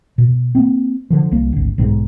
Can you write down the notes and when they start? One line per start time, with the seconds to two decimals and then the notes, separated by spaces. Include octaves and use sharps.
0.18 B2
0.55 A#3 C4
1.10 D3 F3
1.31 C2 A#3
1.53 G#1 D2
1.78 B1 G#2 E3 G#3